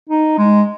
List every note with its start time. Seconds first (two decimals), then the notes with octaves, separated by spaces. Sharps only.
0.10 D#4
0.38 G#3